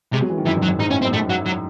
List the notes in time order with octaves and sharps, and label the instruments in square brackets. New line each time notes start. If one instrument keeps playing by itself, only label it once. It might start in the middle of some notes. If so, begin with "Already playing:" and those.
[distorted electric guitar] C3 [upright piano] G#3
[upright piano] F#3
E3
D#3
[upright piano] F#2 [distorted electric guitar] E3
[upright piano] G#2
[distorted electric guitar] F#3
[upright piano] F#2
[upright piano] G#2 [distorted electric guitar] D#4
[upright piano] A2 [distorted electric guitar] C#4
[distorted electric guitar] C4
[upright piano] F#2
[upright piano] G#2 [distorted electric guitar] A3
[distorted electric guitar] F#3
F#3